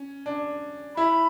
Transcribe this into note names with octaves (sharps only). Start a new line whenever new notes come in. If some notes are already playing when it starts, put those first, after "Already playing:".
Already playing: C#4
D4
E4 B5